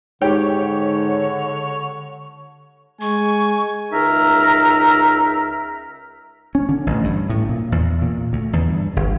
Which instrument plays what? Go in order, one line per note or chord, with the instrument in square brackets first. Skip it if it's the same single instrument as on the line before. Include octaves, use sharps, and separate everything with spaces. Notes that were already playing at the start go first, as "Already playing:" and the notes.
[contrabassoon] G#2 [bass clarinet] D3 [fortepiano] G4 G5 [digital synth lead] C#5
[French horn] G#3 [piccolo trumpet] G#5 [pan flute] C#6
[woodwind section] C#2 D#4 A#4 E5 A#5
[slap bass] C#4
D3
A1
G2
A2
A#2
E2
A#2
D2
E2
G2
G1